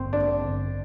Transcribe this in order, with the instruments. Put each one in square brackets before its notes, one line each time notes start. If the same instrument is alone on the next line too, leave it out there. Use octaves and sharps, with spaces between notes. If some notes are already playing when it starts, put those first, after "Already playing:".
Already playing: [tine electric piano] A1 G2 D3 [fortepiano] C4
[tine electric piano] A1 [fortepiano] D4
[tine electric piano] G2 D3